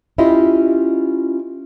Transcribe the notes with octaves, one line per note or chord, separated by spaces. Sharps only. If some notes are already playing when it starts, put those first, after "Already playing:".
C#4 E4 F4 G4 D#5